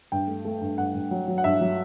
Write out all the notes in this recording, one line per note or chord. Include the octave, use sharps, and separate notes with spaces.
G2 G5
A3
A3
G2
G2 F#5
G2
F#3
F#3
F#5
G2 E5
F#3